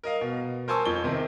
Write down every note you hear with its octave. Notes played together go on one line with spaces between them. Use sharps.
A#4 D#5 F5
B2
A#4 C5 G#5 A5 C#6 E6
F2 G7
C3 D#3